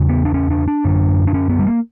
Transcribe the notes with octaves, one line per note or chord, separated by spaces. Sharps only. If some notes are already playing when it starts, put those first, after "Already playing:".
Already playing: E2 C#3
B3
D4
C#4
D4
D4
F#2 D3
D4
C#4
B3
G3
A#3